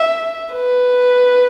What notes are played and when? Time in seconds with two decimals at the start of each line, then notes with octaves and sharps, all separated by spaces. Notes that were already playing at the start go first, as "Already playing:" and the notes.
Already playing: E5
0.53 B4